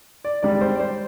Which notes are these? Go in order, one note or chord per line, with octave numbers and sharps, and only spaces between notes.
D5
G#1 G#2 G3 D5
C5
D5
C5